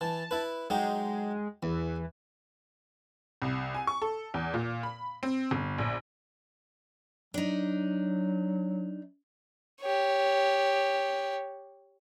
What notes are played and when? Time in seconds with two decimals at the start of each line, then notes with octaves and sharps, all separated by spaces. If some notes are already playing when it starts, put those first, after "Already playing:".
0.01 E3 A5
0.31 E4 B4
0.70 F#3 G#3 D#4 G4
1.63 E2 E3
3.42 C2
3.75 G#5
3.87 C#6
4.02 A4
4.34 E2
4.54 A#2
4.83 B5
5.23 C4
5.51 G1
5.78 A#1
7.34 F#3 D4 D#4
9.81 G4 C#5